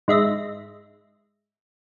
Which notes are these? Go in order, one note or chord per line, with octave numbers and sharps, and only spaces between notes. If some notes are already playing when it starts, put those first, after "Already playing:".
G#2 G#3 E5 A#6